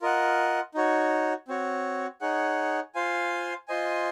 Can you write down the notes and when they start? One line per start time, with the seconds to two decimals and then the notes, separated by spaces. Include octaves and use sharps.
0.02 F4 A#4 D#5 F#5
0.74 D#4 F#4 C#5
1.48 C4 F#4 C#5
2.21 D#4 G#4 C#5 F#5
2.95 F4 C5 F5 G#5
3.68 F4 C5 D#5 G#5